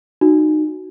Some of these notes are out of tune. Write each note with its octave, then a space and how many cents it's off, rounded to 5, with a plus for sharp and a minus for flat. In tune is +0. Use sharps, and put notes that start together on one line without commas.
D#4 -25 F#4 +0